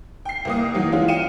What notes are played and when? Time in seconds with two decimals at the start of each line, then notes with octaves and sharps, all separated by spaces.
0.25 G5 C7
0.45 C2 A#3 D#6
0.74 D#3 E3 F#3 A#3
0.92 E3 G#3 C#4 E4 F4
1.08 F5 G5 C#7 D#7 E7